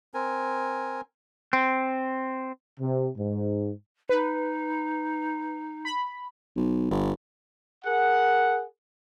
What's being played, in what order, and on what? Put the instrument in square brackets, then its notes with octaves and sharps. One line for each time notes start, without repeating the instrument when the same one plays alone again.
[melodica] C4 A#4 G#5
[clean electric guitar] C4
[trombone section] C3
G#2
[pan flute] D#4 [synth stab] B4
[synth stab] B5
[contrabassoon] B1
G1
[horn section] G#4 A#4 F#5